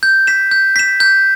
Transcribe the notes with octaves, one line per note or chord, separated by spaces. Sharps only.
G6
B6 E7
G6
B6 E7
G6